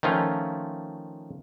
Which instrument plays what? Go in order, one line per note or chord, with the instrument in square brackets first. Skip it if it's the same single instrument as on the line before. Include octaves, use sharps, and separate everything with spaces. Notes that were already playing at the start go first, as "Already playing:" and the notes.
[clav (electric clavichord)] D#3 F3 A3 C#4 F4